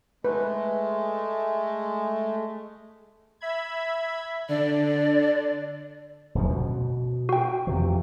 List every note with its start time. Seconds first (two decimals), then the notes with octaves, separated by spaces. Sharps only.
0.24 G#3 A3 B4
3.41 E5 B5 G#6
4.49 D3 D4 D5
6.35 D1 F#2 F3
6.51 B2
7.29 F#4 G5
7.67 F2 C3 E3